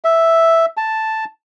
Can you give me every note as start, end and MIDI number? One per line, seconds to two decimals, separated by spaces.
0.04 0.66 76
0.77 1.25 81